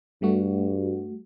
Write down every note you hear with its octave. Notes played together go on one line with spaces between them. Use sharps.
G2 G3 A3 F#4